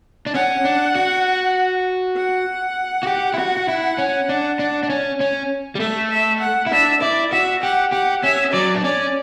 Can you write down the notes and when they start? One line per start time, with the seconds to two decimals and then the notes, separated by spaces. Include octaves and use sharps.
0.26 D4
0.34 C#4 F#5
0.65 D4
0.96 F#4
2.17 F#5
3.03 F#4
3.07 G4
3.34 E4
3.38 F#4
3.57 F#4
3.68 E4
3.98 C#4
4.29 D4
4.59 D4
4.83 D4
4.90 C#4
5.21 C#4
5.75 G3
5.80 A3 E5
6.10 E5
6.41 F#5
6.67 E4
6.72 D4 E5
7.01 E4 D5
7.32 F#4 E5
7.62 G4 F#5
7.92 G4 F#5
8.23 C#4 E5
8.53 F#3 D5
8.75 D4
8.83 C#4 D5